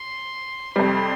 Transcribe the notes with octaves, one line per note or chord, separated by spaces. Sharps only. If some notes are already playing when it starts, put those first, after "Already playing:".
Already playing: C6
F2 C3 G3 C6